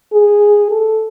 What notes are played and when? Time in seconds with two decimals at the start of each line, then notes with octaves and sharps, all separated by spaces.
0.13 G#4
0.71 A4